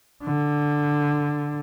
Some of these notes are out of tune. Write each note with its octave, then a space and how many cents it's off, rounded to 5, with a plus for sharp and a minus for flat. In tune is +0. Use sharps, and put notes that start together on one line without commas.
D3 +0